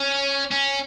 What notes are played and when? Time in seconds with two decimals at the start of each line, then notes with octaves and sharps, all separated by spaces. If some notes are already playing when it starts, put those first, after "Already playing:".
Already playing: C#4
0.51 C#4